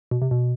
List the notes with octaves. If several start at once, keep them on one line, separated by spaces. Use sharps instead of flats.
B2
C3
B2